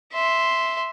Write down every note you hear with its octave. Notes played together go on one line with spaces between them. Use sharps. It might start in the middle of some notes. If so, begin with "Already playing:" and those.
E5 C6